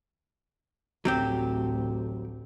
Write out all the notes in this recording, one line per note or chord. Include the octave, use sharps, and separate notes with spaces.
A1 D2 F#3 C4 G4